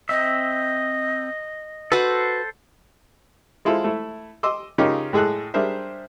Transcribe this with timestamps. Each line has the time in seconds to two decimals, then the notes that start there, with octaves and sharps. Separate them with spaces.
0.09 C4 D#5 E5
1.92 F#4 A4 B4 C5
3.65 G#3 E4 F4 A4 C5
3.84 A3 E4
4.43 D#5 C6 D6 E6
4.78 C#3 C#4 D#4 F4 G4 A#4
5.13 A2 G#3 G#4 A4 F#6
5.54 G3 D4 G#4 A#4 C5 E5